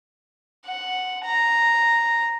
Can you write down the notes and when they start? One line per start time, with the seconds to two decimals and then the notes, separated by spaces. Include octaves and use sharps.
0.66 F#5
1.24 A#5